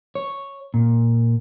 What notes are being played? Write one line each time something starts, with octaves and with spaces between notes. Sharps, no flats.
C#5
A#2